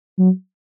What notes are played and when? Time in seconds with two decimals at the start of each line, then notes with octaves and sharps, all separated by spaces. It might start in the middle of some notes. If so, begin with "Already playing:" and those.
0.19 F#3